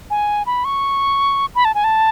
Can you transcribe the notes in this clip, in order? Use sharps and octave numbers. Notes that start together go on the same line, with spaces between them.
G#5
B5
C#6
B5
A5
G#5
A5